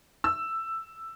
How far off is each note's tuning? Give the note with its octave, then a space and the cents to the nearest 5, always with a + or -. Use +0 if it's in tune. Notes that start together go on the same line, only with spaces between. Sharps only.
E6 +5